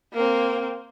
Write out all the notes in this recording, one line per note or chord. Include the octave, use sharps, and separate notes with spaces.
A#3 C4